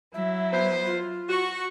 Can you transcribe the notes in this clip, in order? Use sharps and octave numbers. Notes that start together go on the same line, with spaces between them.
F#3 E4 E5
B3 C5
F4
F#4 C#6